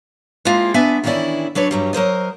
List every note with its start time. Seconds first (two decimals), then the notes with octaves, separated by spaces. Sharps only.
0.45 G#3 A#3 C4 E4 F4
0.74 B3 D4 E5 G#5
1.04 D#3 E3 C#4 D4 E4 D5
1.55 F#3 D4 B4 C#5
1.71 G2 F#3 G3
1.93 F#3 A#4 C5 D#5